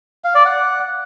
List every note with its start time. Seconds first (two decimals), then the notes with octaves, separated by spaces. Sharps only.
0.24 F5
0.35 D5
0.45 F#5